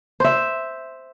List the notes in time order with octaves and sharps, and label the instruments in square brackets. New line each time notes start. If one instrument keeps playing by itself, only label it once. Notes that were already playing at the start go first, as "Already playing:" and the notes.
[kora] C5 E5